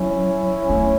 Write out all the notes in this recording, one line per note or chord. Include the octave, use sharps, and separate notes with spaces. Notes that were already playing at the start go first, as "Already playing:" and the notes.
Already playing: F#3 C#4 E4
A3